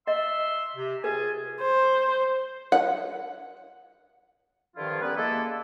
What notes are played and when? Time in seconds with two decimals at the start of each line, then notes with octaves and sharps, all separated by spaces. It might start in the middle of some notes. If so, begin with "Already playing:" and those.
0.07 D#5 E5 C6 E6
0.76 C3 G4
1.04 F4 G#4 B4 G#5
1.61 C5
2.72 F#5
4.76 G2 D3 D#3 F3 E4 F4
5.01 G3 A#3 B3 C#4 B4
5.16 G#3 A#3 E4 A4